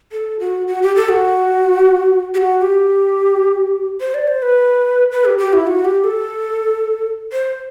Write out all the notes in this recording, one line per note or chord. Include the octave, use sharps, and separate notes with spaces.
A4
F#4
F#4
G4
A4
F#4
G4
F#4
G4
C5
D5
C5
B4
B4
G4
G4
E4
F#4
G4
A4
C5